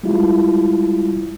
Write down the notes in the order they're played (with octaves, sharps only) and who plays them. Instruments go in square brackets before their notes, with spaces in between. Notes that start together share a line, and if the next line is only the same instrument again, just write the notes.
[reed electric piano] G3 G#3 E4 F4